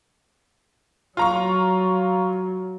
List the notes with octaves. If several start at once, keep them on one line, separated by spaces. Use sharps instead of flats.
F#3 F4 A#5 C#6